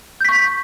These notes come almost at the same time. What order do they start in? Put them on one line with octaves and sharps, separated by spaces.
G6 B6 C#6